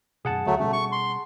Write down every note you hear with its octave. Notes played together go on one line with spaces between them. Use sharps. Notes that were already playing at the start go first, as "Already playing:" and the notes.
F#2 B2 G#4 F#5 A5
D2 F#3 A3
B2 G3 A3 C#4
C#6
C6